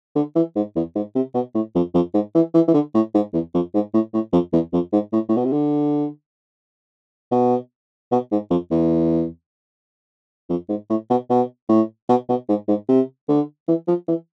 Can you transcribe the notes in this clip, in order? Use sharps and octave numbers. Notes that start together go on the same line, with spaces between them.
D3
E3
G#2
E2
G#2
C3
B2
A2
F2
F2
G#2
E3
E3
E3
D3
A2
G#2
E2
F2
G#2
A2
A2
F2
E2
F2
G#2
A2
A2
B2
C3
D3
B2
B2
G#2
F2
E2
F2
G#2
A2
B2
B2
A2
B2
B2
G#2
G#2
C3
D3
E3
F3
E3